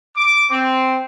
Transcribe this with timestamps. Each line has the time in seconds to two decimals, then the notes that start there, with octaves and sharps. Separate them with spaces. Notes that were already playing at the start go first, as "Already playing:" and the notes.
0.17 D6
0.51 C4